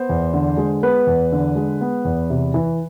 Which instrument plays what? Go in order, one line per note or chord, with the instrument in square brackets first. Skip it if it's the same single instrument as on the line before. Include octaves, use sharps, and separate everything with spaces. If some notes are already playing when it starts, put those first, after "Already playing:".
Already playing: [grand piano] B3 C5
E2
D3
G#3
B3 B4
E2
D3
G#3
B3
E2
C3
E3